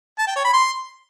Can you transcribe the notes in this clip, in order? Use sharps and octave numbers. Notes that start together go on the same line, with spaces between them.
A5
G5
C#5
B5
C6